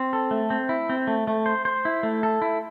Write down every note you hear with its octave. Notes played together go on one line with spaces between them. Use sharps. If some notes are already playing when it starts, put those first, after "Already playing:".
Already playing: C4
A4
A3
C4
E4
C4
A3
A3
C5
C5
E4
A3
A4
E4